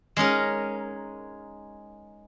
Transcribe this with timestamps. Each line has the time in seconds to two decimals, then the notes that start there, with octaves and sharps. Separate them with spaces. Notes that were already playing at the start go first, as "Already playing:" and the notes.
0.17 G#3 C#4 D#4 A#4